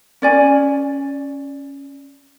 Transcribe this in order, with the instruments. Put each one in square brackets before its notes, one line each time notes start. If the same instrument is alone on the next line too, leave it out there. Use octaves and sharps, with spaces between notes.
[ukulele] C#4 D5 G#5